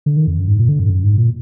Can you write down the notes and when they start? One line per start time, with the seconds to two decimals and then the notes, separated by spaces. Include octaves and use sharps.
0.06 D3
0.17 D#3
0.27 F2
0.38 F#2
0.48 G#2
0.59 A#2
0.69 D3
0.79 F#2
0.86 G#2
0.90 F#2
1.04 G#2
1.18 A#2